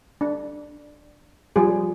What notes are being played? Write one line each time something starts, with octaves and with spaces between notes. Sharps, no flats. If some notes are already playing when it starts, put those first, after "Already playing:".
D4
F3 G3 G#4